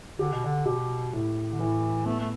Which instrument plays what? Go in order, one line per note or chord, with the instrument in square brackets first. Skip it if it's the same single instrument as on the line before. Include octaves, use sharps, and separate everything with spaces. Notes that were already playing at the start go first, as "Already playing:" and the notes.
[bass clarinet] D3 [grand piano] G4
[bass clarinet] B2
D3
[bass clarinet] B2 [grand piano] G4
[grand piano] A2
[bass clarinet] D3
[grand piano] A2 [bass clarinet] E3
[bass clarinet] A3 [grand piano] B3
[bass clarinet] A3